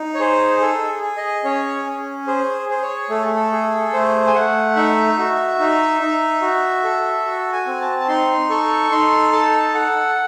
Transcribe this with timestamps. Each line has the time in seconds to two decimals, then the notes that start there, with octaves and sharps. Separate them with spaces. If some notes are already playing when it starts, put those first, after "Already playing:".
Already playing: D#4
0.14 C#5
0.19 G#4 C5
0.61 G#4 A4
1.03 G#4
1.17 D#5
1.44 C#4 C#5
1.86 C#4
2.27 G#4 C5
2.69 G#4 C5
2.82 C#5
3.10 A3 A4
3.35 A4
3.52 G#4
3.93 A3 C5
4.27 G#5
4.34 A3 F#5
4.76 D#4 E5
5.18 F#4
5.59 D#4
6.01 D#4
6.42 F#4
6.84 A4
7.26 F#4
7.53 G#5
7.66 C4
7.81 A5
8.00 A5
8.08 D#4 C6
8.50 A4 C#6
8.91 D#4 C6
9.33 A4 A5
9.74 A4 F#5